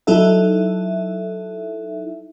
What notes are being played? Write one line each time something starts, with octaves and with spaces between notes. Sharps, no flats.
F#3 D#4 E4 A4 E5